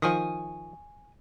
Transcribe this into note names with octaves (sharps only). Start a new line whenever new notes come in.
D#3 F3 G#5 C#6 D#6